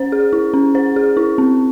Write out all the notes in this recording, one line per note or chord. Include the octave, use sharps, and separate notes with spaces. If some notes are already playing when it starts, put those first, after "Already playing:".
Already playing: C#4 C5
G#4
E4
C#4
C5
G#4
E4
C4